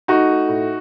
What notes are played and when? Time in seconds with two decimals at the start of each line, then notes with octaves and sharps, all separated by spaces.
0.08 A3 D#4 F#4
0.29 A3
0.48 A2